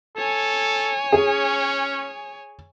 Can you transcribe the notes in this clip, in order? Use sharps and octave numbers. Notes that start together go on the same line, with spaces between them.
A4 C#5 G#5
C#4 G#4